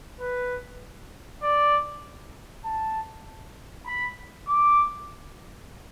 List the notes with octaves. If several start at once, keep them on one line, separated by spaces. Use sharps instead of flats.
B4
D5
A5
B5
D6